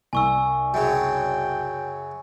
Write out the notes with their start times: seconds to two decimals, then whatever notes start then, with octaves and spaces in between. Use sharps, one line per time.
0.13 C2 G#5 C#6 E6
0.74 F#2 C#3 G5